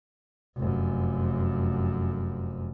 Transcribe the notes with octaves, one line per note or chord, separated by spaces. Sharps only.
F1 F#2